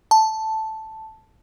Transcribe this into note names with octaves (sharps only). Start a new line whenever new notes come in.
A5